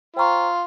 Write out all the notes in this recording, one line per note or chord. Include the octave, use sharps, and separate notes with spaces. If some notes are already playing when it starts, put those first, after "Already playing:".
F4 C5 G5 A#5 C#6